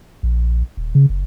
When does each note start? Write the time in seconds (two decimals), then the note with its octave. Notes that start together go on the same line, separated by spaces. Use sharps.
0.23 A#1
0.77 D#1
0.95 C#3
1.10 F#1